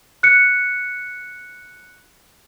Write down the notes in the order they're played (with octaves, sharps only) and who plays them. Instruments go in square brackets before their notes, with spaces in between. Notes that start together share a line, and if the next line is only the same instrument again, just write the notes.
[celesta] F#6 C#7